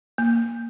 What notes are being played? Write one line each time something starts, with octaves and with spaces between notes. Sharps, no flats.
A#3